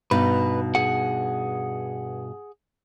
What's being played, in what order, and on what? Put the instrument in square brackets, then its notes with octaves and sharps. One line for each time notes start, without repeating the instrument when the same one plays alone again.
[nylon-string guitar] G2 B2 D#4 [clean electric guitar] B4
[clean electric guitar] G#4 F#5